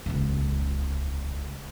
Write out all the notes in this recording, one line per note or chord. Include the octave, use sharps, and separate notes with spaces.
D#1 C#2